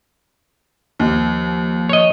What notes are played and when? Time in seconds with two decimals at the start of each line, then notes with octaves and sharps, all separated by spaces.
0.99 D#2 F3
1.89 C#5 D#5